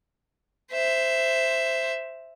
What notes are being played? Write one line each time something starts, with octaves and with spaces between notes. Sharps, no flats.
C5 E5